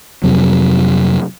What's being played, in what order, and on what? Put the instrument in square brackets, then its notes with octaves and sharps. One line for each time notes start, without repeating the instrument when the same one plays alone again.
[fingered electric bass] F2 C3 F#3